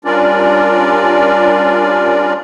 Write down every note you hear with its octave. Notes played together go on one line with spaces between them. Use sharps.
G3 C#4 D4 F4 A#4 D5